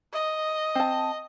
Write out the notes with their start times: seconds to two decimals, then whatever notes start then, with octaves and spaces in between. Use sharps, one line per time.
0.13 D#5
0.75 C4 A5